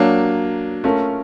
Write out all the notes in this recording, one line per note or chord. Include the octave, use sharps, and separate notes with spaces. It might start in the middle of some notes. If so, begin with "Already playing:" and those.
Already playing: F#3 A#3 D4
A3 C#4 F4 A#4